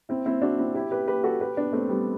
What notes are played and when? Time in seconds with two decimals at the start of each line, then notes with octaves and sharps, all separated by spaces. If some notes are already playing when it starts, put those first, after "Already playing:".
0.09 C4 E4
0.26 C4 E4
0.42 D4 F#4
0.58 C4 E4
0.74 E4 G4
0.91 G4 B4
1.08 G4 B4
1.24 F#4 A4
1.40 G4 B4
1.57 B3 D4
1.73 A3 C4
1.89 G3 B3